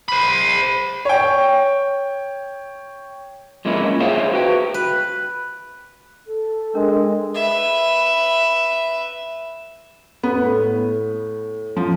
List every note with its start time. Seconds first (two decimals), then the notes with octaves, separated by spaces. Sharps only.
0.08 C5 B5
1.05 C#5 G5
3.65 A#2 G#3 A#3 C#4 E4
4.00 G#4 C5 C#5 E5 F5 G5
4.33 F#4 B4 G5
4.74 B4
6.26 A4
6.75 G#3 D4 A#4
7.35 B4 E5
10.23 B3
10.42 A2
11.77 F3